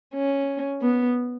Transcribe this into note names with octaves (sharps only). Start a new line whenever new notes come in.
C#4
B3